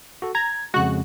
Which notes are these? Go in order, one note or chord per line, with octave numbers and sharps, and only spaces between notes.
F#4 A4
A#5 G#6
F2 C#3 G#3 F#4 F#6